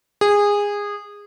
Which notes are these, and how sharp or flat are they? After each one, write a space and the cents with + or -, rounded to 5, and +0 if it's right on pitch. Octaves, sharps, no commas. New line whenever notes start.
G#4 -20